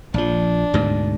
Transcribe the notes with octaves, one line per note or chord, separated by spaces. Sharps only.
A#1 F3 D4
D2 G#2 B2